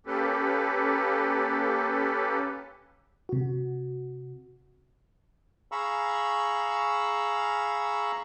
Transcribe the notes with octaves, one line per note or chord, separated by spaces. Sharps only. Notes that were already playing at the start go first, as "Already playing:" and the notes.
A#3 C#4 G4 A4 B4
C3 F#4
G#4 F5 A#5 B5 C#6 E6